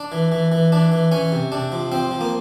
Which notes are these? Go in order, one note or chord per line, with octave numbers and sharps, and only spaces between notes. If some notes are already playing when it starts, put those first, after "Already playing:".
Already playing: D4
E3
E3
E3
E3 D4
E3
E3 C#4
C3
C3 D4
F3
F3 C4
F3
A#3